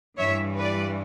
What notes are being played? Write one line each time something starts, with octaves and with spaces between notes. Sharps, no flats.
G2 E3 G3 C#5 E5
B4 D5